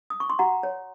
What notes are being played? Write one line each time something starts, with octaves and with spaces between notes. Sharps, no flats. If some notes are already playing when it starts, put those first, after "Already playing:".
D#6
C#6
C6
F#4 F#5 A#5
C#5